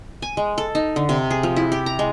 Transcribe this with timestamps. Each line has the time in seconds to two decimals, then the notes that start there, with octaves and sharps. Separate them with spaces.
0.22 G#5
0.37 G#3
0.58 A4
0.75 D#4
0.96 D3
1.09 C3
1.31 G#4
1.43 F3
1.56 E4
1.72 G4
1.86 A#5
1.99 G#3